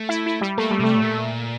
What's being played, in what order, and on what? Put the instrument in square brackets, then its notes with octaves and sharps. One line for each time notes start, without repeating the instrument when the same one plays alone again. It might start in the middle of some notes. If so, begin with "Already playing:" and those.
Already playing: [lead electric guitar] A3
[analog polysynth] E4
E4
G3
[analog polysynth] A3 [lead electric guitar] A#3
[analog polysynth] G3
[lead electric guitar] C3 [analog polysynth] A3
[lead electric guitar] A2
A#2